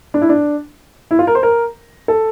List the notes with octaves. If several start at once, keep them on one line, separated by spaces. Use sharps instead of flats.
D4
E4
D4
E4
F4
A#4
C5
A#4
A4